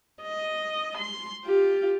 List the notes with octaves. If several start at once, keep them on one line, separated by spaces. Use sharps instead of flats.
D#5
C6
F4 G4